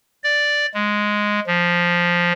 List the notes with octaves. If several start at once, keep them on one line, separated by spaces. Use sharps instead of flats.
D5
G#3
F3